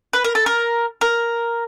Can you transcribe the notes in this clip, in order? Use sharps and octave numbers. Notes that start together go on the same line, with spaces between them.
B4
A#4
A4
A#4
A#4